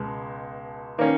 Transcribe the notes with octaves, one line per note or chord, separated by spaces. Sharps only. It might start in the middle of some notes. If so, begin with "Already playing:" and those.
Already playing: C#2 B2 G#3
D#3 A#3 C#4